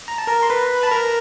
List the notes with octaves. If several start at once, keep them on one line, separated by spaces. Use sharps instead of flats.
A#5
A5
A#4 A#5
C6
B4 B5
A5
A#4 A#5